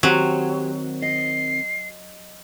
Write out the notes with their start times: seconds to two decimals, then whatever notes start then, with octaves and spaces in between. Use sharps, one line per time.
0.03 D#3 F#3 C4 G4 C5
1.02 D#5 C7